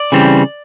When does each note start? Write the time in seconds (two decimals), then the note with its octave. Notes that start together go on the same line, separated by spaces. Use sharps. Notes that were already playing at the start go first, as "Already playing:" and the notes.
Already playing: D5
0.12 C#3 E3 G3 C4